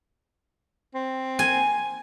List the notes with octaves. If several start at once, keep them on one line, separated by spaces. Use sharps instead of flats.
C4
G#5